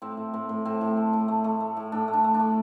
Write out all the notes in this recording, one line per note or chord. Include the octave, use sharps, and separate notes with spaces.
A2 C4
A2
A2 C4
A2
A2 C4
A2
A3
A2
A3
A3
A3
A2
A2 D4
A3
D4
A3
D4
A3